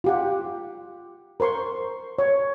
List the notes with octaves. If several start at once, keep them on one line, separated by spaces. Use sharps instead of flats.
F4 G4 F#5
A#4 C5 C6 C#6
C#5